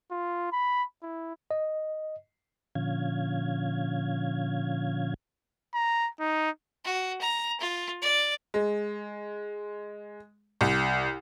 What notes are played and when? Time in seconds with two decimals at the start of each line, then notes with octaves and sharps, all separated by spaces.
0.11 F4
0.52 B5
1.02 E4
1.51 D#5
2.75 A#2 D3 F3 C#4 F5 G#6
5.74 A#5
6.20 D#4
6.85 F#4
7.21 A#5
7.60 F4
8.02 D5
8.54 G#3
10.61 C2